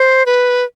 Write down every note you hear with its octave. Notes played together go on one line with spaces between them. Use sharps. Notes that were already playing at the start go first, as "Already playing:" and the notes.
Already playing: C5
B4